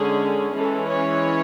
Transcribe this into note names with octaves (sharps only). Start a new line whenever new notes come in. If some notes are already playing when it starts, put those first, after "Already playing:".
Already playing: D3 G#3 C#4 G#4
E3 G#3 C#4 A4
C#5